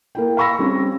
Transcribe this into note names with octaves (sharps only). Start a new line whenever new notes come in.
A#3 E4 G5
F5 B5 C#6 E6 A#6
G3 C4 C#4